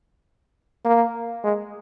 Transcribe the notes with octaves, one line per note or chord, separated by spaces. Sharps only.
A#3
G#3